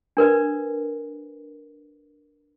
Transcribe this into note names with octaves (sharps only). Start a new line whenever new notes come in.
D4 A#4 B4 D5